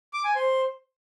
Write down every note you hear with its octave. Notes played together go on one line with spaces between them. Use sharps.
D6
G#5
C5